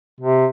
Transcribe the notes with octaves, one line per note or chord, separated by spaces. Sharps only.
C3